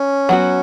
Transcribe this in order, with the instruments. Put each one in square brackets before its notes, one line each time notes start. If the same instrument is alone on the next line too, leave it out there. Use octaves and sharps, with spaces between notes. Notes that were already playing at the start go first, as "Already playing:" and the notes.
Already playing: [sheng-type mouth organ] C#4
[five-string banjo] F#3 B3 F#4